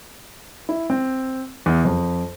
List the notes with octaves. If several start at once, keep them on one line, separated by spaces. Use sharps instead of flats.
E4
C4
E2
F2